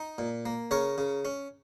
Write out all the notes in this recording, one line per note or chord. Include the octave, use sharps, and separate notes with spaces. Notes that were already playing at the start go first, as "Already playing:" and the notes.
Already playing: D#4
A#2
A#3
C#3 A#4 C#5
C#3
C#4